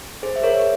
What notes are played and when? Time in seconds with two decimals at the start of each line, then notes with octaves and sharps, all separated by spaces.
0.23 G#4 C5
0.36 E5
0.43 A#4 C#5